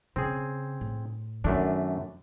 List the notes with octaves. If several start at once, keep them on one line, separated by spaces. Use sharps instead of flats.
C#3 C4 G#4
A2
F#2 D#3 A3 D4